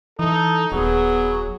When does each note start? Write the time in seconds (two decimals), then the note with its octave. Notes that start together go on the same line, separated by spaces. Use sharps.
0.19 E3 D#4 A4
0.72 D#1 F#3 B3 G#4